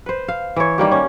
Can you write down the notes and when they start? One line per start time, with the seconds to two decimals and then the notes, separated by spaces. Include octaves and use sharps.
0.06 B4 C5
0.28 F5
0.56 E3 C#5
0.78 D#3 G3 A#3 G4
0.91 C#4